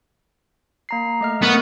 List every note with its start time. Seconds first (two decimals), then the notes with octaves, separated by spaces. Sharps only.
0.89 A#3 A#5 C7
1.21 A3 D#5 F6
1.42 A3 B3 A#4 C#6